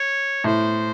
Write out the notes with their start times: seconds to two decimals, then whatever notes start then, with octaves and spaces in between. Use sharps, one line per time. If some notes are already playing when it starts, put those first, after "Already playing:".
Already playing: C#5
0.44 A2 C5